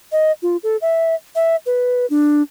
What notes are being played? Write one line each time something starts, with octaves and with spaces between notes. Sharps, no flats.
D#5
F4
A4
E5
E5
B4
D4